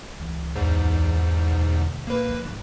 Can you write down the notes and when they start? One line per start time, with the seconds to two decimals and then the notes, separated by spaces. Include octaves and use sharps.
0.20 C#2 E3
0.56 E2 G#2
1.48 D2 B2
2.07 A#2 A#3 B4
2.29 F3
2.45 G#1